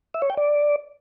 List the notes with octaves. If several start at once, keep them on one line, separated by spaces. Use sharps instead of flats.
E5
C#5
G5
D5